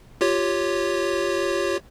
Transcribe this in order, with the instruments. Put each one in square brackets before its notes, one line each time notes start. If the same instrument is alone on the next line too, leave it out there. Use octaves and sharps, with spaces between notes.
[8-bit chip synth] F4 G4 C#5